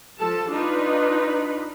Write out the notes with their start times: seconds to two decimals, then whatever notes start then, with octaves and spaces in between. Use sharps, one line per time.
0.19 F3 A4 A5
0.49 D4 D#4 F4 B4